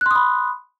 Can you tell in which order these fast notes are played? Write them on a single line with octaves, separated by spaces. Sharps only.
F#6 C6 D#6 B5